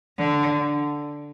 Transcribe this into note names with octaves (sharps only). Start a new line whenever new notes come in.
D3